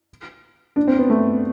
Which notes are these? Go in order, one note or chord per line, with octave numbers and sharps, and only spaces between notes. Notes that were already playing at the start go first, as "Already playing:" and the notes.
D4
C4
B3
A3